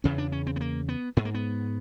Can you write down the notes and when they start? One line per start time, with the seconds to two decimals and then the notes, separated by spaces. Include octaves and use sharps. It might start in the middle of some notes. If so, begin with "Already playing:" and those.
0.04 E2 C#3 C#4
0.18 D4
0.32 C#4
0.47 C4
0.56 B3
0.61 A#3
0.89 B3
1.17 G#2 B3
1.25 A#3
1.34 B3